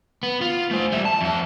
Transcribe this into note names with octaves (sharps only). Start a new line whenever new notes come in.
B3
F4
A3 C5
G3 E5
A5
F2 E5